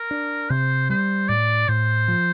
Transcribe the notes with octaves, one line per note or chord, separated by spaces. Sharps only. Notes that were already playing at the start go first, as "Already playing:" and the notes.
Already playing: A#4
D4
C3 C5
G3 C5
A2 D5
A2 C5
F3